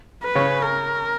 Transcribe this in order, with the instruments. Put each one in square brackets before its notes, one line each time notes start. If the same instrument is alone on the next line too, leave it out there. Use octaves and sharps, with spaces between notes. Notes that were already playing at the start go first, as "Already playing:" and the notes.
[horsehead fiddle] B4
[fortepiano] C#3 C#4
[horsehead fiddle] A#4